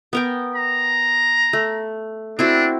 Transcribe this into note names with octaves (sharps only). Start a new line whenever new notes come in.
B3 A#4 G5
A#5
A3
C4 D4 E4 F#4